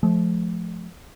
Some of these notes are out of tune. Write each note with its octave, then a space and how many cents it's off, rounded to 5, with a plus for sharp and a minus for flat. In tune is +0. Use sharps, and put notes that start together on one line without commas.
F3 +0 A3 -35